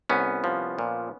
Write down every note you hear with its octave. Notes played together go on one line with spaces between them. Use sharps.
C2 B3 C#4
F3
A#2